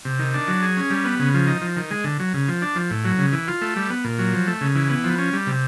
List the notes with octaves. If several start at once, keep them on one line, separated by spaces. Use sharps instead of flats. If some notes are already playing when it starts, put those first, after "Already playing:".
C3
D#3
D4
F#3
G#4
C#4
G3
B3
C#3
F3
D#4
F3
D#3
G#3
D3
F#3
C#3
F3
D4
F3
A2
F#3
C#3
E3
F4
A3
G3
B3
A#2
F#3
F3
A3
C#3
E3
B3
F3
C#4
G3
C3